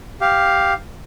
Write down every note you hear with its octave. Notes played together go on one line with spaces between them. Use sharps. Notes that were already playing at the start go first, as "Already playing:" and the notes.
G4 F5